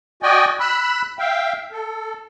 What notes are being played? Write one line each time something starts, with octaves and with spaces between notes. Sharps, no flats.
F#4 D5 D#5 G5 G#5
B5 E6 F#6
E5 F5 G5
A4